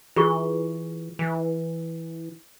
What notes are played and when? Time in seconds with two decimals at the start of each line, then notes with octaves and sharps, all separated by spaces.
0.16 E3 F4 G#4 C#6
1.19 E3